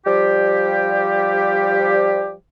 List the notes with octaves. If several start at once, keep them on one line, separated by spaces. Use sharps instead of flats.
F3 G3 G4